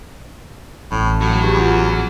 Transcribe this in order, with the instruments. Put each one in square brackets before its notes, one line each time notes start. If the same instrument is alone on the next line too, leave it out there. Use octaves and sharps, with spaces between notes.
[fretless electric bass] A1 [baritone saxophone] A2
[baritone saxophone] A2 [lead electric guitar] F#3 F#4
[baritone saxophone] G2 [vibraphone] G4 G#4
[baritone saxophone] E2 [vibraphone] F4 F#5
[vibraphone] G#4